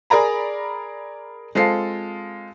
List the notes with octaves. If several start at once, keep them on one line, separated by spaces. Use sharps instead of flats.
G#4 A#4 D5 A#5 B5
G#3 C4 F4 A4 C7